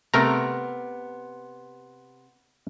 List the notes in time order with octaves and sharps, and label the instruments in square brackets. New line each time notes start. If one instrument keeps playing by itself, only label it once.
[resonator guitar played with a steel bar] C3 B3 [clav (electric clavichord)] A3 A#4 A#5